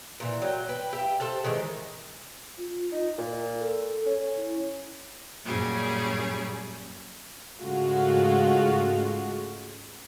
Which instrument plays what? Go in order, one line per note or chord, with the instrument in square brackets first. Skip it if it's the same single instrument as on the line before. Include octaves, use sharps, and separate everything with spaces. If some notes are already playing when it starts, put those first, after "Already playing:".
[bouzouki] A#2 E3
F#3 G5
B4 G5
G4 E5 G5
F4 A4 C5 A5
D#3 E3 G#3 C5
[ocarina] F4
[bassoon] D#4
A#2
[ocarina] A4
[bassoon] C#4
[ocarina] E4
[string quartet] F#2 A#2 G3 C#4 G#4
[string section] G#2 C#3 G#3 A3 F4 F#4